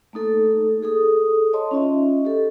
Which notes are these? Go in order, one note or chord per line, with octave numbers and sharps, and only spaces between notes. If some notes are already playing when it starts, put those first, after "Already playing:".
A3 A#3 D#4 A4
G#4 A4 D#6
C#5 D#5 A5 C6
C#4 D#4 F4 D#5 E5
G4 A4